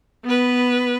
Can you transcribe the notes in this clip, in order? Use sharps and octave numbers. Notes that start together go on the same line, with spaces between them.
B3 B4